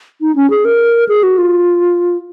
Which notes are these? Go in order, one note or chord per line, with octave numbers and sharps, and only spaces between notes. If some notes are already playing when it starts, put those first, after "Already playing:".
D#4
C#4
G#4
A#4
G#4
F#4
F4